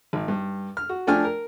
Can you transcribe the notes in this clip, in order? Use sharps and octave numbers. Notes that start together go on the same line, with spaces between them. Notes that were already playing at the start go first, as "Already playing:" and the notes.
G#1
G2
F6
F#4
F3 A3 D4 G5 G#5 F6
A#4